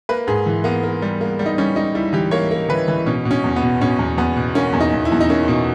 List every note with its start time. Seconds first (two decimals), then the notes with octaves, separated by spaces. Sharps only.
0.09 A#3 B4
0.27 G#2 G#4
0.46 E3
0.64 A#3 B3
0.84 A#3
1.02 G3
1.21 A#3
1.39 G3
1.46 D#4
1.58 G3 C#4
1.76 G3 D#4
1.95 G3 E4
2.13 E3 G4
2.31 A#3 C#5
2.51 A#3
2.69 E3 B4
2.88 E3
3.06 B2 C#4
3.25 B2
3.31 C#4
3.44 E2
3.56 B3
3.62 B2
3.81 B2 C#4
3.99 E2
4.18 E2 B3
4.36 B2
4.55 A#3 C#4
4.73 E2
4.80 D#4
4.92 E2
5.05 E4
5.12 E2
5.20 D#4
5.30 A#3 C#4
5.48 B2